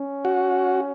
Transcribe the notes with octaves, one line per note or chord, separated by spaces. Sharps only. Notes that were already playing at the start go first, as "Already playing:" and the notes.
Already playing: C#4
F#4